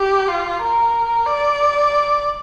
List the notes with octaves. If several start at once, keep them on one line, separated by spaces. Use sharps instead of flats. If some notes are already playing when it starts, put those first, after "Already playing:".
Already playing: G4
F4
A#4
D5